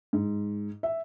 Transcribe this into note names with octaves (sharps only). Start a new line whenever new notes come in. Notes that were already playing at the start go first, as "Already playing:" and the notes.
G#2
E5